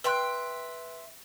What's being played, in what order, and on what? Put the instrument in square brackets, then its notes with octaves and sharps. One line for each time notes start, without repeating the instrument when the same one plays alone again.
[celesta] B4 F#6 [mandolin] E5 G5 C6